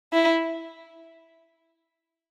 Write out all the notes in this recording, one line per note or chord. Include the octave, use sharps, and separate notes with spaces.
E4